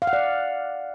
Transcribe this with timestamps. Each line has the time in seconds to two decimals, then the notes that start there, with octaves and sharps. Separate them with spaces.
0.02 F5
0.07 F#5
0.13 D5